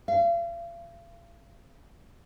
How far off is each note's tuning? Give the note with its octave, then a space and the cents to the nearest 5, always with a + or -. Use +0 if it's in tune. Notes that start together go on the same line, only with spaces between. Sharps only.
F5 -40